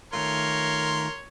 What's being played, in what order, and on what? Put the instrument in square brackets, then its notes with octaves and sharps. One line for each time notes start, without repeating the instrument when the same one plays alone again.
[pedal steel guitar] D#3 A3 F4 [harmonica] A#4 C6 [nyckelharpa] C#5